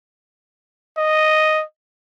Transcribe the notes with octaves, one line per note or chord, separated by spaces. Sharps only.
D#5